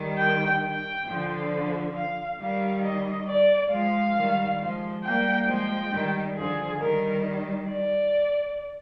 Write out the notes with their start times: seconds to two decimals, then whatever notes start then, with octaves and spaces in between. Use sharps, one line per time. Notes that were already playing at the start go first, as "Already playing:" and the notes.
Already playing: D#3 G3
0.18 G5
0.63 G5
1.06 D3 F3
1.95 F5
2.39 D#3 G3 F5
2.84 D#5
3.28 D5
3.71 F3 G#3 F5
4.16 D#3 G3
4.60 F3 G#3
5.04 G3 A#3 G5
5.48 F3 G#3 G5
5.92 D#3 G3
6.37 D3 F3 G#4
6.80 D#3 G3 A#4
7.68 D5